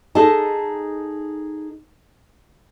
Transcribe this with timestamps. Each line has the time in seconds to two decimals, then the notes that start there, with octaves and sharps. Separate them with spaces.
0.15 D#4 G#4 A4 D#5 A5